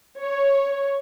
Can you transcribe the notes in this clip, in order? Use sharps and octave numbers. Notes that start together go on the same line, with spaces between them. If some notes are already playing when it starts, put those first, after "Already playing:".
C#5